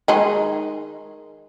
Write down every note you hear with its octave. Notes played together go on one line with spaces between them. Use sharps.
D#3 G#3 D#4